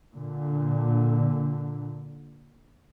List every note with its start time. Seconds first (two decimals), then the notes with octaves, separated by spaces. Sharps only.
0.13 A#2 D3